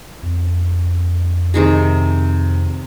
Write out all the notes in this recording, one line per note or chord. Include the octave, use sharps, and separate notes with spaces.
F2
C3 D#3 G#4